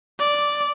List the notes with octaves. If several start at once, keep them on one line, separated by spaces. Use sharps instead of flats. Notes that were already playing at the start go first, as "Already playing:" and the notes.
D5